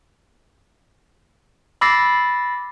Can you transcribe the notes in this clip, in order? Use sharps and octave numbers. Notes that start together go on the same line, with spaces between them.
B5 D6 E6 A6 A#6 C7